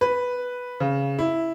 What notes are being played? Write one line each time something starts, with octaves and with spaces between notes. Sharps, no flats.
B4
C#3
E4